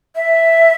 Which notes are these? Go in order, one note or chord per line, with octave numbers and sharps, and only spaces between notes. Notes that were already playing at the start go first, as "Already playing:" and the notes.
E5